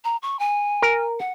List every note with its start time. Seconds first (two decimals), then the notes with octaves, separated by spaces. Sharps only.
0.04 A#5
0.22 C#6
0.39 G#5
0.82 A#4
1.19 F#5